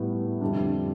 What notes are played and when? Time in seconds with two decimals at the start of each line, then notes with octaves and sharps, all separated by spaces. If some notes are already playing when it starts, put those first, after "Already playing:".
Already playing: A2 G3 B3 E4
0.41 F2 D3 G3 D4